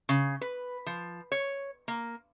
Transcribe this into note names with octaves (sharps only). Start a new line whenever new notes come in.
C#3
B4
F3
C#5
A#3